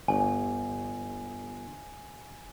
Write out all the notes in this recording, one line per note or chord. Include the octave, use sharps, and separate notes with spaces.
G1 G#5